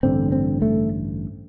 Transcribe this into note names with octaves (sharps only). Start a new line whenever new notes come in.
A1 G2 D3 C4
C4
A3